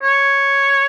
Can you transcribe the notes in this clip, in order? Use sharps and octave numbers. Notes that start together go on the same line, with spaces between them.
C#5